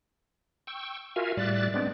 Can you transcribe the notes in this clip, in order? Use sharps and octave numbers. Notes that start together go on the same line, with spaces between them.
G5 C#6 E6
F4 F#4 A#4 E5 F5 G#5
A2 G3 D5 E5 F#6 A6
G#3 B3 C4 D4 D5